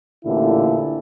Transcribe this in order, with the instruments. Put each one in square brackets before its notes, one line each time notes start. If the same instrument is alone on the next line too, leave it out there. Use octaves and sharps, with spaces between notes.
[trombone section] A1 A#2 D3 E4